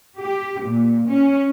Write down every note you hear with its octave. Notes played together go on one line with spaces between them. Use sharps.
G4
A#2
C#4